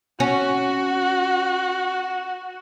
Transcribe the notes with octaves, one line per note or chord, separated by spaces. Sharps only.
C#4 F#4